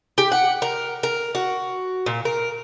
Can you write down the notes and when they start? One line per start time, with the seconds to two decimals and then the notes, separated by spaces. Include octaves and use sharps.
0.18 G4
0.32 F#5
0.62 A#4
1.03 A#4
1.35 F#4
2.06 A#2
2.25 A#4